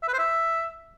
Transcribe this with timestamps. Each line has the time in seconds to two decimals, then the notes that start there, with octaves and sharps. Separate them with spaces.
0.03 E5
0.08 B4
0.13 C5
0.18 E5